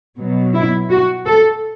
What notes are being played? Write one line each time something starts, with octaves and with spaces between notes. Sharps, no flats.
B2 F#3
E4
F#4
A4